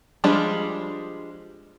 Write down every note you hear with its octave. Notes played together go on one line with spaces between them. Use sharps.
F3 G3 G#3 D4 F4